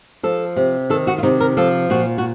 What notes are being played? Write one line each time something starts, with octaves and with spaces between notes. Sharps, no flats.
F3 A4
C3
D#3 A4
F#4
F4
C3 D#4
A#4
F3 A4
A#2 F#4
F#4